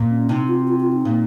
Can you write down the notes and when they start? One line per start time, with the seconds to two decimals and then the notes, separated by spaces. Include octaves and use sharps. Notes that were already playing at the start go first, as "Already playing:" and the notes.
Already playing: A#2
0.11 C#4
0.29 C3 D#4
0.48 F4
0.67 F4
0.80 F4
0.93 D#4
1.05 A#2